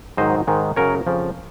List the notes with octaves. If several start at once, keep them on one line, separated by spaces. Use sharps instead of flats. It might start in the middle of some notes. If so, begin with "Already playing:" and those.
G#2 D#3 F#3 C5 D#5
G#2 D#3 G#3
F#2 C#3 F#3 A#4 C#5
F2 C#3 F3